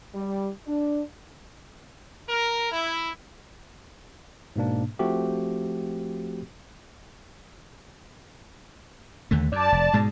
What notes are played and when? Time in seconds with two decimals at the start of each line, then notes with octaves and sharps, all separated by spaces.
0.14 G3
0.66 D4
2.29 A#4
2.71 E4
4.56 G#2 B2 A#3 D4
4.99 F3 A3 C4 F#4 G4
9.31 D#2 D3 A3
9.52 F#2 D5 A5
9.72 F1
9.93 G#2 B2 G#3